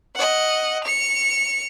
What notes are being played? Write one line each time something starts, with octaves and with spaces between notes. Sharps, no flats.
D#5 F#5
C#7 F7